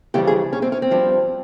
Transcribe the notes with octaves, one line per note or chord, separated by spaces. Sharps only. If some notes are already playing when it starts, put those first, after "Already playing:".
F2 C#3 E3 G3 G4
G#4
C#4
C4
C#4
C4
G2 F3